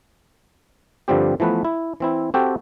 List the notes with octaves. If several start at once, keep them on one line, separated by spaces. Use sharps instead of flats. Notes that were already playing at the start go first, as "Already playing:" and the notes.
G2 D3 F3 G3 C4 G4
E3 F3 A3 B3 B4
E4
E3 C4 E4
C4 F#4 G4 A4 G5